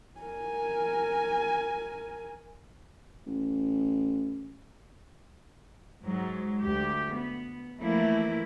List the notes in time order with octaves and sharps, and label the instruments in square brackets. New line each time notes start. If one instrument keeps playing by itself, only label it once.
[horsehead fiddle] A#4 G#5
[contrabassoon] A1
[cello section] G#2 F#3 G#3
D2 G4
B3
E3 F3 A3 A#3 E4